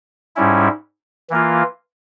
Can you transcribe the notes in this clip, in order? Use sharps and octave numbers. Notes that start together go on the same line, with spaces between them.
G#2 G3 C#4 E4
E3 A#3 F4